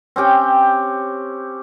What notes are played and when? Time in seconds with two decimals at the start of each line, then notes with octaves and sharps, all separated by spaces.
0.16 C4 C#4 G4 G5